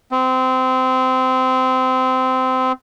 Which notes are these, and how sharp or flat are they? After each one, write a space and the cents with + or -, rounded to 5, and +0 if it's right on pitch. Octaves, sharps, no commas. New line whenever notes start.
C4 -20